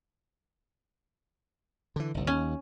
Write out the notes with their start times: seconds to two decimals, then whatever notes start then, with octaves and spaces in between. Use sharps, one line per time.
1.96 D3 E3
2.14 G1 C2
2.27 D#2 C#4